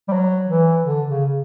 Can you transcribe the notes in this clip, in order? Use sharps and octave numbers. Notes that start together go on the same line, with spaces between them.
G3
F#3
E3
D3
C#3